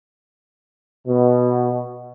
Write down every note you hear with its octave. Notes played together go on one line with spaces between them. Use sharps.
B2